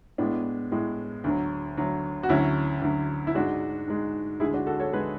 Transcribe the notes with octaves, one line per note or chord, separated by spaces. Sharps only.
A2 G#3 B3 D4
A2 G#3
D2 D3 F#3
D2 D3 F#3
F#4
D2 D3 F#3 C#4 E4
D2 D3 F#3
E4
G#2 G#3 D4 F#4
G#2 G#3
D2 D3 G#3 E4 G#4
D4 F#4
F#4 A4
A4 C#5
D3 G#3 G#4 B4